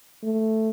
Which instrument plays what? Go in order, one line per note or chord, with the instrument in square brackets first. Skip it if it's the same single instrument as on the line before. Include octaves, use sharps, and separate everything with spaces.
[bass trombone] A3